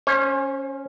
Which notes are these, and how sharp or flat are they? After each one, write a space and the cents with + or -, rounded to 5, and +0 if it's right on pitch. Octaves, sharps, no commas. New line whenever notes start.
C#4 +0 C5 +40